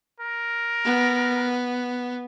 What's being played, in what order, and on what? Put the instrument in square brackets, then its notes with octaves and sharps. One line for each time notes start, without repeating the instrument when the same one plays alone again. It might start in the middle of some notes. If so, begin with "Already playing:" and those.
[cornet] A#4
[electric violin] B3